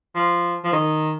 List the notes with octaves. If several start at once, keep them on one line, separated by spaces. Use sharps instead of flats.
F3
F3
D#3